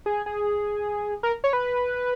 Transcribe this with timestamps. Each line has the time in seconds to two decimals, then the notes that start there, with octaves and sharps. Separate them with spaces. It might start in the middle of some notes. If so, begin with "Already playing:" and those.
0.06 G#4
0.26 G#4
1.23 A#4
1.44 C#5
1.53 B4